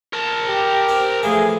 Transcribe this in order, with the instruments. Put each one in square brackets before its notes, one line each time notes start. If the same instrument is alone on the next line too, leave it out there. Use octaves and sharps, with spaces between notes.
[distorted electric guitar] A#4 A5
[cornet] G4
[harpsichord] C4
[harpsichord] A2 E3 F3 [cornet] G#4